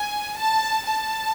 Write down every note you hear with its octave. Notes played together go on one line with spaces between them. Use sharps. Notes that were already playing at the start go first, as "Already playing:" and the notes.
Already playing: G#5
A5
A5